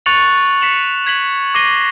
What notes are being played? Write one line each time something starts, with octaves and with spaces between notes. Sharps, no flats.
C#6 F#6 A6 C#7 F7 F#7
B6 C#7 E7 F#7
G#6 B6 F#7
D6 A#6 C7 D#7 G7